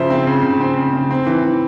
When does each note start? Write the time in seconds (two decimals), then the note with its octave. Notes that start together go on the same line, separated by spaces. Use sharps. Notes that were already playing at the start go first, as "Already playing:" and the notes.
Already playing: C#3 F3 C5 E5
0.10 C4
0.27 C#3
0.43 C#3
0.61 C4
0.77 C#3
0.93 C#3
1.11 C4
1.26 E3
1.44 E3